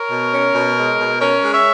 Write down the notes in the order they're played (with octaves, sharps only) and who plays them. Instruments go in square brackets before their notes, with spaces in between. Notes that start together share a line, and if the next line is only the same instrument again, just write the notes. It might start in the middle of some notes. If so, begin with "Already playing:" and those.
Already playing: [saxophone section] A#4 C#5
B2
C#4
B2
G#3
B2
C#4 A#4 C#5
G#3
C#5 E5